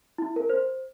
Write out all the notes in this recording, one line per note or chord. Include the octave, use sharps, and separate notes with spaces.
E4
A#4
C5